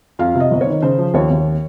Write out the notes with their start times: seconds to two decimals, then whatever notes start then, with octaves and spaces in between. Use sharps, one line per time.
0.19 F2 F5
0.35 C3
0.40 D#5
0.51 G1
0.61 C#5
0.67 D#3
0.82 C#3 C5
0.98 F3
1.14 D#2 C#5
1.31 D#2